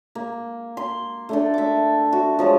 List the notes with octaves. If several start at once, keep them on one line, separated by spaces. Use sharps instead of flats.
A#3
C6
A3 D4 A4
E5 D6
F#4
F3 F#3 G#3